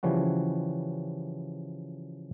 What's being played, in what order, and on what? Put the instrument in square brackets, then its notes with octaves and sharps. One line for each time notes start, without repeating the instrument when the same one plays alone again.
[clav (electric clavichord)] C#3 E3 F3 G3 F#4